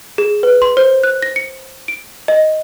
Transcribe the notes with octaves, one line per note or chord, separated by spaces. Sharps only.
G#4
B4
C6
C5
F#6
A#6
C#7
D7
D#5